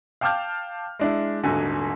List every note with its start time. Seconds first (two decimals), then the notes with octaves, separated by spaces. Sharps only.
0.21 F5 G5 A5 D6 F6 G6
0.99 G#3 D4 E4
1.44 D#1 G#1 D3 F#4 G#5